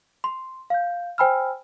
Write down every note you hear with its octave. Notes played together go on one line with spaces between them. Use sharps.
C6
F5 G6
C5 G5 G#5 B5 E6 F6